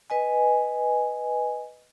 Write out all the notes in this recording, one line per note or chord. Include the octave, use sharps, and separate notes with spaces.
B4 D#5 G#5